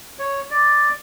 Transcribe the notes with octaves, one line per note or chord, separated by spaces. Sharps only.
C#5
D5